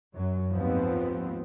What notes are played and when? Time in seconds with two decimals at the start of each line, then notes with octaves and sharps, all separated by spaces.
0.14 F#2 F#3
0.52 G#1 D#2 F3 B3 C4